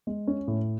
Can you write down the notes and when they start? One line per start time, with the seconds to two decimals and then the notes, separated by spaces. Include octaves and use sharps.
0.07 G#3
0.27 C#4
0.48 A2